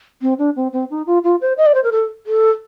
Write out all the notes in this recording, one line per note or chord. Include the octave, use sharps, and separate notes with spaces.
C4
D4
C4
C4
D#4
F4
F4
C5
D#5
D5
C5
A#4
A4
A4